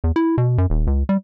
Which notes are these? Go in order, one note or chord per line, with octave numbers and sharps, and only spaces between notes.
E2
E4
B2
F#2
D#1
C#2
G3